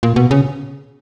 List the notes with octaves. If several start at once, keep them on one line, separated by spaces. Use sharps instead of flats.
A#2
B2
C#3